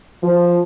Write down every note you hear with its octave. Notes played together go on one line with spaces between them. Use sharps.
F3